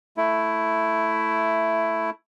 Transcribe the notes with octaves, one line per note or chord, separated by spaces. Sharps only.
A3 E4